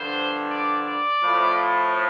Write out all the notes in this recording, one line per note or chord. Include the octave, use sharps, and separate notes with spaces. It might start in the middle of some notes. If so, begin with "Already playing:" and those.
Already playing: G2 D3 F3 C5
D5
D5
A2 F3